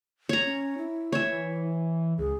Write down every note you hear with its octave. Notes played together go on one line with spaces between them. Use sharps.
C#5 A#5
C#4
E4
E3 C#5 E5
C#2 G#4